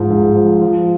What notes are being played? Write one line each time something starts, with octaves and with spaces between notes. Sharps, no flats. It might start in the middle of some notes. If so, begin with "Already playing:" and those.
Already playing: G#2 F3
G#2
F3
F3